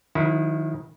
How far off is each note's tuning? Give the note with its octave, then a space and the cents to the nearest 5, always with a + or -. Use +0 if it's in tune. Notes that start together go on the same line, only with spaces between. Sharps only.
D#3 +0 F#3 -45 E4 -15